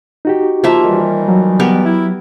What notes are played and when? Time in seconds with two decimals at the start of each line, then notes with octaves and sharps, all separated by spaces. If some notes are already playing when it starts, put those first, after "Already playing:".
0.25 D#4 F#4 G4
0.64 F3 A#3 E5
0.84 D#3 E3 G3
1.28 F#3
1.60 B3 G4 A#4
1.85 E4